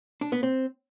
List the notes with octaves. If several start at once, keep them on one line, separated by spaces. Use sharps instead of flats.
D4
B3
C4